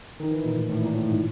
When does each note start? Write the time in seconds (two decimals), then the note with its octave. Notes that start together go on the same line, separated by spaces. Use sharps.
0.20 D#3
0.31 E3
0.45 A#2
0.57 A2
0.69 A2
0.82 A#2
0.95 A2
1.06 G#2